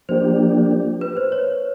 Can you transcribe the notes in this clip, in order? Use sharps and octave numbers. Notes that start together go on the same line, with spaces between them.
F3 A#3 D4 G4 C5
B4
C5
C#5